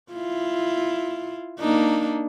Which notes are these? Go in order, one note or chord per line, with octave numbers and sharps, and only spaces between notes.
E4 F4
A#3 D4 D#4